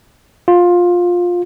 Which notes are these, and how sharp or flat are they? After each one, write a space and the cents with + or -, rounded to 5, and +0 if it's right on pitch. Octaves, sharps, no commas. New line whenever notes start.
F4 +15